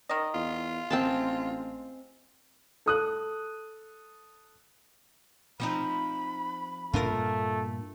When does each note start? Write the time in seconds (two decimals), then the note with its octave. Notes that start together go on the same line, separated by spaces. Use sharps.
0.09 D#3 D#5
0.34 E2 F4
0.91 A1 G#3 C4 G5 A5
2.86 A4 D#6 F#6
5.60 F3 C4 D#4 B5
6.94 G2 A#2 A3 D4 F4 A#4